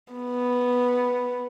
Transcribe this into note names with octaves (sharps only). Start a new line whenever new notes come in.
B3